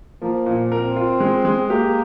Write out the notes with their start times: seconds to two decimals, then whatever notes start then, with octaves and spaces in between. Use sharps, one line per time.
0.22 F3 A#3
0.46 A#2
0.72 C4 A#4
0.96 F4
1.20 G#3
1.45 G#3
1.70 A#3 G4